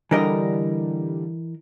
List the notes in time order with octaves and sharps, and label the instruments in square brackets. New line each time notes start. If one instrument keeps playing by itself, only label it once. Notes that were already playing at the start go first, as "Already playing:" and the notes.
[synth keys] D3 G3 [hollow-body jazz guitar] E3 A#4 D#5